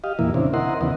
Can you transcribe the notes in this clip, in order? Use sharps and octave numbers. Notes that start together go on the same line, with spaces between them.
G4 D#5 F5
E2 A#2 E3 A#3 E4
C#3 E3 C4 D4
E4 A#4 D#5 F#5 C6
D#2 C#3 E3 B3 D#5